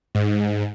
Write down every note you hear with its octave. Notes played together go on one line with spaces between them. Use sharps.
G#2